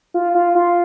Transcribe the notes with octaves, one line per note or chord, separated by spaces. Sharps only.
F4
F4
F4